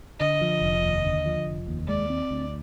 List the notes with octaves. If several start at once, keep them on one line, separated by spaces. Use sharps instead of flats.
D3 D#5
F3
F1
D#2
D3
F3
F1
D#2
G#3 D5
C4
D2